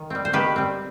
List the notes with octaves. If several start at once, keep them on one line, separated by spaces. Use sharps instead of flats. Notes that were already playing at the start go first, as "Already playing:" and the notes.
Already playing: D#3
G3 C4
C5
D#3 G4 B4
G3 C4